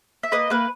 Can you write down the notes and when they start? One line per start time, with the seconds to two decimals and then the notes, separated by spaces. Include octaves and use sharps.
0.23 E5
0.32 A#3 B4 D#5
0.50 A#3 B4